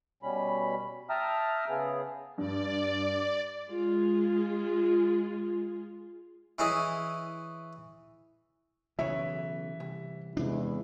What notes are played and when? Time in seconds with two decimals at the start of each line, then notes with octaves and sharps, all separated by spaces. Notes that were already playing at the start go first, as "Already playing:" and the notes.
0.23 B2 G3 C#4 B5
1.10 E5 G5 A5 A#5 D#6 F6
1.69 C#3 B3 G#4
2.38 G2 D5
3.68 G#3 F4 G#4
6.59 E3 C#4 E4 G#4 D#5
8.99 B1 C#3 E3 C#5 E5
9.80 C2
10.37 E2 C3 G#3 D4 E4